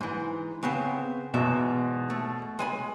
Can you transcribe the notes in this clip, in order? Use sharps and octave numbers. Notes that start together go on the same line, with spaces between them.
G#2 E3
C#3 B3 C4
E2 G#2 B2 E5
A3
G#3 G#5 B5